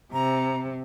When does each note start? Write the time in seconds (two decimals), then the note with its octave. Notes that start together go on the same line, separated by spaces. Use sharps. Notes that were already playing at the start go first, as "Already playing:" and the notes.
0.13 C3 A#5